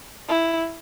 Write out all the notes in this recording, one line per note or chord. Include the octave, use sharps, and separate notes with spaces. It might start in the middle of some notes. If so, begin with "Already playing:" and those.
E4